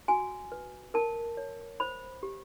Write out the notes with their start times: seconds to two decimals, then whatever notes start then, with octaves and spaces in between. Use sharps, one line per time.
0.08 F#4 G#5
0.52 B4
0.94 A#4 A5
1.37 C#5
1.80 C5 B5
2.23 G4